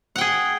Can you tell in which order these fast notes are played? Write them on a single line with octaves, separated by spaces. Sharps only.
F#5 G5 G#4